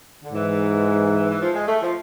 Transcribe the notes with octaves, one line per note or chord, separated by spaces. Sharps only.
D3
G#2 E3
E3
F3
G#3
A3
F3